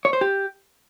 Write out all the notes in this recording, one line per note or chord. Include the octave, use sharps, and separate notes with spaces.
C#5
C5
G4